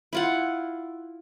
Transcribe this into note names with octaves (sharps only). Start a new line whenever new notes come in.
E4 F4 F#5